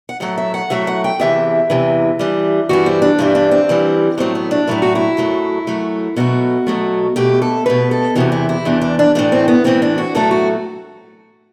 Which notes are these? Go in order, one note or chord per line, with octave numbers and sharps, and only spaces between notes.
F#5
A2 F#3 A3 F#5
E5
F#5
A2 F#3 A3 E5
F#5
G5
E2 C3 E3 E5
E2 C3 E3
G2 E3 G3
G2 E3 G3 F#4
C4
D4
G2 E3 G3 E4
D4
C4
G2 E3 G3
A2 F#3 A3 C4
B3
D4
A2 F#3 A3 E4
F#4
E4
F#2 F#3 A3
F#2 F#3 A3
B2 F#3 A3 F#4
B2 F#3 A3
B2 A3 G4
A4
B2 A3 B4
A4
E2 C3 E3 F#4
E4
E4
E2 C3 E3 D4
D4
D4
A2 E3 A3 D4
C4
B3
A2 E3 A3 C4
D4
F#4
A2 F#3 A3 A4
F#4